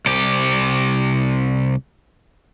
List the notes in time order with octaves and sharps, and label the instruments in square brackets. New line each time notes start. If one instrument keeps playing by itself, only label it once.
[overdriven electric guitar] C2 G4